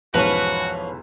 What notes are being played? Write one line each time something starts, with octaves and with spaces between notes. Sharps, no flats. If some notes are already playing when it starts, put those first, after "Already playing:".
B1 E2 G#2 F3 C#4 F#4 B4